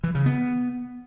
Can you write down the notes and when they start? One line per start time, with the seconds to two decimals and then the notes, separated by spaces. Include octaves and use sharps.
0.04 E3
0.15 C#3
0.26 B3